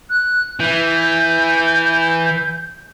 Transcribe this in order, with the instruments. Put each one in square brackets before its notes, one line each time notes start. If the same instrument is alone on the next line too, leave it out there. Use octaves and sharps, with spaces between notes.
[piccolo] F#6
[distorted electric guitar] E3 [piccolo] G6